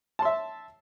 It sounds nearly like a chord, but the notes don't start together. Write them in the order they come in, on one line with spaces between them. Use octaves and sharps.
A5 C6 E5